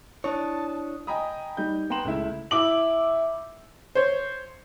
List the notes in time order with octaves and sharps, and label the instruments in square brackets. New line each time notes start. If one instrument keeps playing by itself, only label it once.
[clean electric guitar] D4 C#5 [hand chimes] E4 D#6 [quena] A5
[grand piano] D#5 G5 G#5 A#5 B5 D#6
G3 D#4 G6
B3 G5 A#5 C6 E7 F#7
C#2 A3 E4
[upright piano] E4 D6 F#7
[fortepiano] C5 C#5